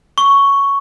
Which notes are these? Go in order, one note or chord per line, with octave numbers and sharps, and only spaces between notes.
C#6